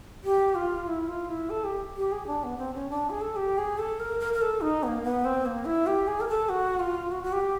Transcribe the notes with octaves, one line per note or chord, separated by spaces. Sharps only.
G4
F4
E4
F4
E4
A4
G4
G4
G#4
D4
B3
C4
C#4
D4
G#4
A4
G4
G#4
A4
A#4
A#4
A#4
A4
D#4
B3
A#3
B3
C4
A#3
E4
G4
G#4
A#4
A4
F#4
F4
F#4
F#4
G4